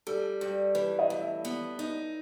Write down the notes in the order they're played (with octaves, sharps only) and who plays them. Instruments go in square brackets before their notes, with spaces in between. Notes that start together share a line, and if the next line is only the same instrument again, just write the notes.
[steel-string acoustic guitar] G3 [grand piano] A4
[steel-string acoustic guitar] G2
[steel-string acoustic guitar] E3 [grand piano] B4
[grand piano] D#5
[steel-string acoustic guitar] G2
[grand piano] E5
[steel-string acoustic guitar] B3
D#4